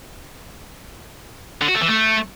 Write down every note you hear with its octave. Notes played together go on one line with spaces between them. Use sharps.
D3
F#4
A3
E3
A3